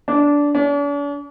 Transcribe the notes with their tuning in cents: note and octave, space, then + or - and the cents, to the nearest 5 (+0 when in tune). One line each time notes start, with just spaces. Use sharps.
D4 -15
D4 -45